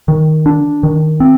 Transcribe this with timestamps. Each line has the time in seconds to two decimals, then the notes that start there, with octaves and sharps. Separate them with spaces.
0.08 D#3
0.46 D4
0.83 D#3
1.20 C4